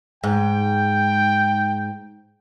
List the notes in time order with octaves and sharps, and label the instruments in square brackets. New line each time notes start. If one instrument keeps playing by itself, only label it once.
[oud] G#2 [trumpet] G5